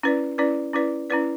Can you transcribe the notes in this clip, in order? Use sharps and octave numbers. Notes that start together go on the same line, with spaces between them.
C#4 E4 B4 D5
C#4 E4 B4 D5
C#4 E4 B4 D5
C#4 E4 B4 D5